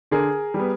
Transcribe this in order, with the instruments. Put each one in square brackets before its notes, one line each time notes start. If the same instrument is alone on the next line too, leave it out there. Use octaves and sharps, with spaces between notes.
[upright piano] D3 G#4 A#4
G3
B3